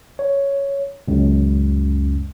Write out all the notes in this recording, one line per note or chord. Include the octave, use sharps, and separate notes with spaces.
C#5
C#2 F#2